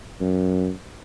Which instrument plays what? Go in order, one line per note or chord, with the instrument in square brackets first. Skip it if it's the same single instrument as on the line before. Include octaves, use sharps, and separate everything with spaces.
[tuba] F#2